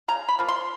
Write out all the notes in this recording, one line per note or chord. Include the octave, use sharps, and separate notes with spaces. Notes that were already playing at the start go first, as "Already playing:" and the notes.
C#3 A#5
B5
F3 A#3
C6